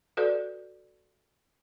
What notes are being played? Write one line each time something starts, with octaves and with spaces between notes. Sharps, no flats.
F#4 A4 B4 D5